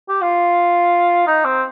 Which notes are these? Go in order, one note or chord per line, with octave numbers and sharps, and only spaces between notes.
G4
F4
D#4
C4